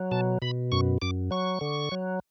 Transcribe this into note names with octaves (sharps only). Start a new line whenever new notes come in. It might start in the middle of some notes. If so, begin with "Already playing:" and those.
Already playing: F#3
B2 A5
B2 B5
F#2 C#6
F#2 D6
F#3 C#6
D3
F#3